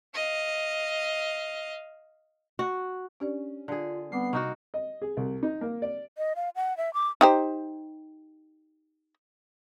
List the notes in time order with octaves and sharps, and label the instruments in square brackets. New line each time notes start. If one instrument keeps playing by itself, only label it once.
[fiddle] D#5 F5
[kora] F#4
[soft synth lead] C#4 [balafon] D4 G4 D5
[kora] D3 G#4 [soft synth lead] F4
[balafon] G3 C4 D6 [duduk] B3 [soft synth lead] C7
[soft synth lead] C3 [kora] A#3 D#4 F#4 [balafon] C#6
[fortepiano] D#5
G#4
C2
D#4
A#3
D5
[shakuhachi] D#5
F5
F#5
E5
D6
[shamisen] D#4 G4 C5